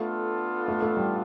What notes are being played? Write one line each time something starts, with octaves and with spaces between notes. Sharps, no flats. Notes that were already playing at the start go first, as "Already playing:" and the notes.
Already playing: A3 B3 D4 F4 A4
A3
A3
G3